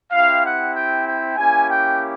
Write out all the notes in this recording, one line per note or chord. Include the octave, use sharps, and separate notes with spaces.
C4 E4 G4 F5
F#5
G5
G5
A#3 C#4 E4 G4 G#5
G5